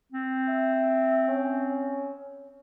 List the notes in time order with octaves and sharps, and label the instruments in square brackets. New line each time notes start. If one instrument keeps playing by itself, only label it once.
[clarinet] C4
[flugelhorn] E5
C#4